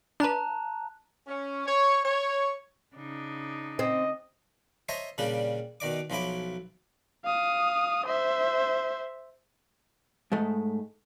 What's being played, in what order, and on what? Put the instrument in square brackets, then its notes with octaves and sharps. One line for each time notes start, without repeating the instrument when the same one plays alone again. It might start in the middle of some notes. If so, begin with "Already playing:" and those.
[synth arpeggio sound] D4 B4 [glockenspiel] A5 A#5 F#6
[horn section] C#4
C#5
C#5
[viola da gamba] C#3 D4 D#4
[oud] C4 [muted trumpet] D#5
[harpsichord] C5 C#5 D#5 E5 A5 A#5
A#2 C#3 G3 D4 G4
B2 D#3 D5 D6
B1 F3 F#3 E4 B5 D6
[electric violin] F5 D#6
C5 E5
[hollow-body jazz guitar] G#2 G#3 A3